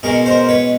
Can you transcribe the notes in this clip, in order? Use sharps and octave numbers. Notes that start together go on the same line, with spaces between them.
B2 G#3 C#4 G#4 A#4
A#4 C5
B4 C#5